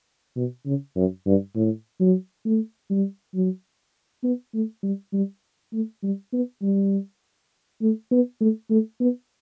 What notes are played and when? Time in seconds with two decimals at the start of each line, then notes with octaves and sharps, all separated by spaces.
0.36 B2
0.66 C#3
0.96 F#2
1.26 G2
1.56 A2
2.00 F#3
2.45 A3
2.90 G3
3.35 F#3
4.24 B3
4.54 A3
4.83 G3
5.13 G3
5.73 A3
6.03 G3
6.33 B3
6.62 G3
7.82 A3
8.11 B3
8.41 A3
8.70 A3
9.00 B3